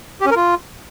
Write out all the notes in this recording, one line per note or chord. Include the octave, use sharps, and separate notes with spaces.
G4
C#4
A#4
F4